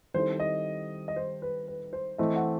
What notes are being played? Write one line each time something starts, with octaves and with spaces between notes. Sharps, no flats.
D#3 G3 C4 E4 A4 C5
D#5
D#5
C5
B4
B4
C5
E3 A3 C4 D#5
F#5